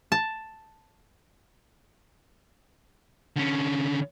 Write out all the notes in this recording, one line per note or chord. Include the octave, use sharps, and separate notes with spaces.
A5
D3 C#4